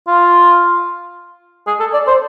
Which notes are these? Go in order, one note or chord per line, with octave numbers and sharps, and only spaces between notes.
F4
G#4
A4
D5
C5